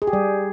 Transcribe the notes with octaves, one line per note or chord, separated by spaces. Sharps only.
G#4
G4
G3